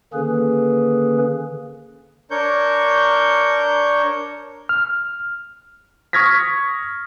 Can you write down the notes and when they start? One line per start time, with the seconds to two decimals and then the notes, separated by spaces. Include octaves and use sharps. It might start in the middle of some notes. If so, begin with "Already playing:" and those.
0.14 D3 D#3 A#3 C#4 G#4 B4
2.31 D4 A#4 C#5 C#6 G6
4.69 F6
6.13 C#6 D#6 F6 G#6 A#6 B6